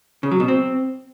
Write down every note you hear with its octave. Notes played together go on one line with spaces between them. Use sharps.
C#3
F#3
B2
C4